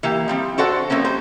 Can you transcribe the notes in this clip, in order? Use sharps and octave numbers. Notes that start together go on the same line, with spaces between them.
E3 A#3 G4
F3 G3 C4
D3 F#4 A4 C5 D5 F#5
F2 A3 A#3 C#4
G3 C5